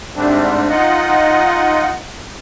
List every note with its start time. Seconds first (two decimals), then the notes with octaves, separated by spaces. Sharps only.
0.16 G#2 D3 G3 A3 C4 D4
0.69 D#4 F4 D#5 F#5